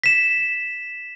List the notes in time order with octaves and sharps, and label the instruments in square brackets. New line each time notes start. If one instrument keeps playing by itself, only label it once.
[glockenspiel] B6 E7